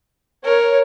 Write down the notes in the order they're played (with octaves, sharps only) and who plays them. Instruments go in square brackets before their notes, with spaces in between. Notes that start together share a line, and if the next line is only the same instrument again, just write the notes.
[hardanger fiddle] A#4 [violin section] C#5